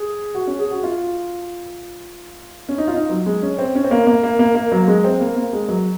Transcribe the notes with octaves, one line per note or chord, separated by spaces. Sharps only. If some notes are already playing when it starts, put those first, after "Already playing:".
Already playing: G#4
F#4
C#4
G#4
F#4
F4
C#4
D#4
F4
D#4
F#3
G#3
C#4
C4
C#4
C4
A#3
A#3
A#3
A#3
A#3
F#3
G#3
C4
A#3
A#3
G#3
F#3